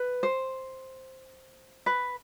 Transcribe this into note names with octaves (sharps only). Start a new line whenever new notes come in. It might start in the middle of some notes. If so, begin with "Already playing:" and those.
Already playing: B4
C5
B4